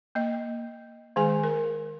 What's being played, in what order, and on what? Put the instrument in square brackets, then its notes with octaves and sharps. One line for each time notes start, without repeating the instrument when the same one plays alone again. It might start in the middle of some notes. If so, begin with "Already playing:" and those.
[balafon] A#3 D#5
D#3 G#3 G#4 G#5
A#4